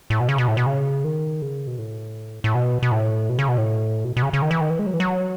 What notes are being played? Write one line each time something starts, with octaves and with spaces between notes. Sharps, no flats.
A2
B2
C#3
B2
A2
B2
C#3
D#3
C#3
B2
A2
A2
B2
B2
A2
B2
C#3
B2
A2
B2
B2
C#3
C#3
D#3
E3
D#3
E3
G#3
F#3
E3
F#3